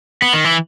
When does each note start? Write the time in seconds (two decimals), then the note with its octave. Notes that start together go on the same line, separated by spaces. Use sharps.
0.22 B3
0.34 D#3
0.44 E3